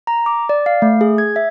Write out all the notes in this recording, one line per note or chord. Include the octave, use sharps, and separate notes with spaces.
A#5
D6
D5
F5
A3
G#4
G#6
E5